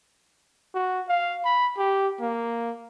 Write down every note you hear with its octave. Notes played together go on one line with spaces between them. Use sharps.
F#4
F5
B5
G4
A#3